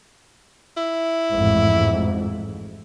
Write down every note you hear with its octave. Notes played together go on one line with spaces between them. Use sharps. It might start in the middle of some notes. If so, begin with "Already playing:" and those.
E4
A1 F2 G#2